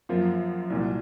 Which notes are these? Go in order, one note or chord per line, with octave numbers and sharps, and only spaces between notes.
F#2 F3 A#3 F4
C2 A#2 F#3